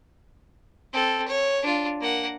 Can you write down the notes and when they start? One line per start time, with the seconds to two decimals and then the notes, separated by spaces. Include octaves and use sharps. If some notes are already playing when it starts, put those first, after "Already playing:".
0.93 C4 A4
1.28 C#5
1.63 D4 F4
2.00 A#3 F#5